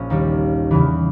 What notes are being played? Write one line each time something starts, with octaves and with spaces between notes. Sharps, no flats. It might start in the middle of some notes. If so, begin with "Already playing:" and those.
Already playing: A#1 C#4
D#2 D#3 G3
E2 C#3 E3